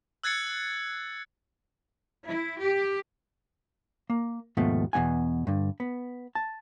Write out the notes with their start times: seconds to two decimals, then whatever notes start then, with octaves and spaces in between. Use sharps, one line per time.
0.24 E6 F#6 G#6 A6 C7 C#7
2.26 E4
2.62 G4
4.10 A#3
4.57 D#2 G#2 B2 F3 A3 B3
4.93 E2 B2 C#4 F#5 G#5
5.47 G2 D3
5.80 B3
6.35 A5